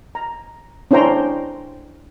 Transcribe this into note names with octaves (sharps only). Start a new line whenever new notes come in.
A#5
C#4 D4 E4 C5 G5 A#5